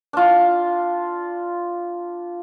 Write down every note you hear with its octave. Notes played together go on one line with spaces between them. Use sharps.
D4 F4